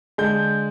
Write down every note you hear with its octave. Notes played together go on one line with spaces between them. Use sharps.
D3 G#3 G6